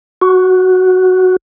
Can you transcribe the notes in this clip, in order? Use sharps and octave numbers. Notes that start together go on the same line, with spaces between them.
F#4